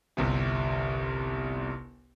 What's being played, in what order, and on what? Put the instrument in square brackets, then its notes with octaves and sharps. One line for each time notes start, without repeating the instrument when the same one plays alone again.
[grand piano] G1 C2 C3